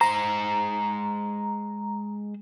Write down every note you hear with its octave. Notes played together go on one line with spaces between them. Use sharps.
G#3 C5 A#5